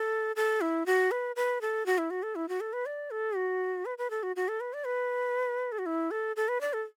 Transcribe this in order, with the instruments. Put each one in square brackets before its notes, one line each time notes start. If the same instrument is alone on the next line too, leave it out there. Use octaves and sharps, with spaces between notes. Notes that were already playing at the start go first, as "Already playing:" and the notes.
Already playing: [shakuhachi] A4
A4
E4
F#4
B4
B4
A4
F#4
E4
F#4
A4
E4
F#4
A4
B4
D5
A4
F#4
B4
B4
A4
F#4
F#4
A4
B4
D5
B4
A4
F#4
E4
A4
A4
B4
D5
A4